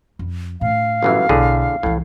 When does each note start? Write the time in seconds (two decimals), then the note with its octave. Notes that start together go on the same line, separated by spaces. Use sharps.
0.19 F2
0.61 A2 D3 F5
1.03 G1 F#2 E3
1.29 B1 A2 D3 G#4
1.83 C2 A2 E3